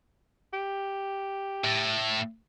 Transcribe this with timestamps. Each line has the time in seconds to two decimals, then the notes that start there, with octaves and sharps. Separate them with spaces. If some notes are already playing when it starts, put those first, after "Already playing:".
0.53 G4
1.64 A2